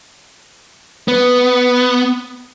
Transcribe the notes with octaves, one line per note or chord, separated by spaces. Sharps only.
B3